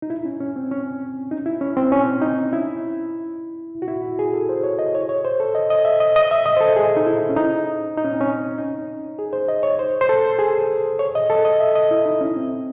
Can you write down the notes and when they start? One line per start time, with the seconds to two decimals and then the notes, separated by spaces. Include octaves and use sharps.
0.02 D#4
0.10 E4
0.25 C#4
0.40 C#4
0.56 C4
0.71 C#4
1.31 D#4
1.46 E4
1.61 C#4
1.77 C4
1.92 C#4
2.22 D#4
2.53 E4
3.82 F#4
3.88 E4
4.19 G#4
4.33 A4
4.49 C5
4.64 C#5
4.79 D#5
4.94 C#5
5.09 C#5
5.25 C5
5.40 A4
5.55 D#5
5.70 D#5
5.85 E5
6.00 D#5
6.16 D#5
6.31 E5
6.46 D#5
6.57 C5
6.61 A4
6.76 G#4
6.97 D#4
7.07 E4
7.29 C#4
7.37 D#4
7.98 D#4
8.04 C#4
8.13 C4
8.21 C#4
8.58 D#4
9.19 G#4
9.33 C5
9.48 D#5
9.63 C#5
9.79 C5
10.01 C5
10.09 A4
10.39 G#4
10.99 C#5
11.15 D#5
11.30 A4
11.45 D#5
11.60 E5
11.76 D#5
11.91 E4
12.06 D#4
12.21 C#4
12.36 C4